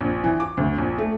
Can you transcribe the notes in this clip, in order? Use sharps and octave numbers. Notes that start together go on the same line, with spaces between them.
A#1
E3
D6
D2
A#1
A3